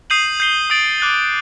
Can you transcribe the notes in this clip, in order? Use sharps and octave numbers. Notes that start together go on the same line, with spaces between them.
D#6 G6 C7 D#7 F#7
G6 C7 G7
D#6 A6 D7 F#7
D6 F#6 A6